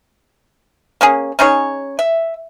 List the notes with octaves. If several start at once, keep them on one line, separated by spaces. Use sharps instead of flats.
A#3 C#4 G#4
C#4 D#4 G#4 C#5
E5